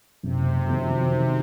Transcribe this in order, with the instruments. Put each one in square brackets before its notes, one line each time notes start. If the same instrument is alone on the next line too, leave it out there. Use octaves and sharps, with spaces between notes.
[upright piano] F#1 [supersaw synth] C3
[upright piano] F2 D#3 F#3
D#3